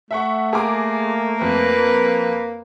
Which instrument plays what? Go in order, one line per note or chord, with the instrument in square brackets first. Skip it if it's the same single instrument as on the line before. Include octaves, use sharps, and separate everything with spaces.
[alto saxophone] A3 [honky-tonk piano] E5 F#5 C#6
[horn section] A#3 [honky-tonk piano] G#4 A#5 D6
[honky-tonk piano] F2 [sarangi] B4